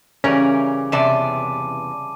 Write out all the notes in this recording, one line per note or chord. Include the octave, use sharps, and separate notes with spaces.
C#3 E3 G3 C#4 A#4 G#5 D6
E2 C3 D5 E5 A5 D6 D#7